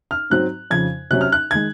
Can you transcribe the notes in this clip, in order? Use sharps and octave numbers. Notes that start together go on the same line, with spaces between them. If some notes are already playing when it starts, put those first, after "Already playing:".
F6
G#2 F#3 C4 F#6
F2 C#3 F3 G#6
C3 F#3 C#4 F#6
F6
F#6
D#3 G#3 G#6